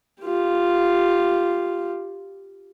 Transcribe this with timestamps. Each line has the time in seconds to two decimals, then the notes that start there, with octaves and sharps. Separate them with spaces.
0.23 F4 G4